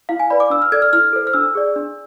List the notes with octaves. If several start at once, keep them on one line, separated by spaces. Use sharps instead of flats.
E4 F5
G#5
B4 D5 B5
D6
D4 E6
F6
A4 D5 G#6
F6
E4 F6
A4 C5
F6
D4 E6
G#4 D5
D4